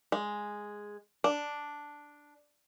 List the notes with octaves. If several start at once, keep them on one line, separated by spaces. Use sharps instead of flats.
G#3
D4